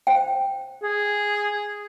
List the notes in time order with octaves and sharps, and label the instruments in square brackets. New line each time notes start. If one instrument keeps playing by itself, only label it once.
[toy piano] C5 G5
[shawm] G#4